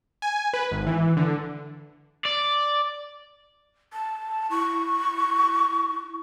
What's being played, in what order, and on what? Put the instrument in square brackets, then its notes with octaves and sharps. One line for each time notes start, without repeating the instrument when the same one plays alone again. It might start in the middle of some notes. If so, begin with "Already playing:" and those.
[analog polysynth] G#5
B4
G#1
E3
D3
[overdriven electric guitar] D5
[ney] A5
[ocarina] E4 [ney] C#6